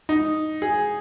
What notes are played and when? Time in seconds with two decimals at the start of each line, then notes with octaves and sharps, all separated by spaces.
0.09 D#4
0.62 G#4